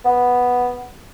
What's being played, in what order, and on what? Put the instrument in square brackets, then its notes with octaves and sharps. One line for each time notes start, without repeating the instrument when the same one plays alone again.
[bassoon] B3